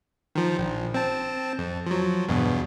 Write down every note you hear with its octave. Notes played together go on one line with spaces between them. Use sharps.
D#3 F3
A#1
C4 A5
F2
F3 F#3
E2 G2 B2